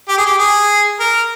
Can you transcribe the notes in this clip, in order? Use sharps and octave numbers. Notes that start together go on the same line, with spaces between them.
G4
G#4
G4
G#4
A#4